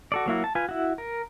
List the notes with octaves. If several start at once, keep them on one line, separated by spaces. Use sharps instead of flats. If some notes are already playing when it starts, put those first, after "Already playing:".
F#4 A4 D5
F#3 A#3 E4 F#4
A5
F4 B4 G#5
E4 F#4
A#4